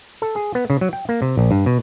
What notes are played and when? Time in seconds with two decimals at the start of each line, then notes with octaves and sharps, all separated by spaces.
0.22 A4
0.36 G#4
0.55 B3
0.70 C#3
0.81 F#3
0.93 G5
1.09 A#3
1.22 C3
1.37 A#1
1.51 G2
1.66 B2